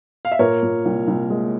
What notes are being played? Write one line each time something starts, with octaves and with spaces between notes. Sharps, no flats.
F5
E5
A#2 A#4 C#5
A#2
C2
C2
G#3